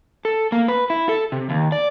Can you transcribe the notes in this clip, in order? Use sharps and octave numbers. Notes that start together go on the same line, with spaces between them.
A4
A#3
B4
E4
A4
C3
D#2
D5